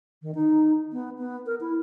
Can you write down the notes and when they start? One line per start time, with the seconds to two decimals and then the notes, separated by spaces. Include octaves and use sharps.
0.22 D#3
0.35 D#4
0.92 B3
1.18 B3
1.46 A#4
1.61 E4